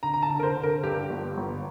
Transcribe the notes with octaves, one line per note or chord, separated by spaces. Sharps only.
D3 A#5
A#5
A5
D3
A#4
C5
D3
A#4
G2 G4
G1
G1